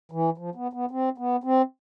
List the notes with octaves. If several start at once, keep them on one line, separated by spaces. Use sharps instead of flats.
E3
F3
B3
B3
C4
B3
C4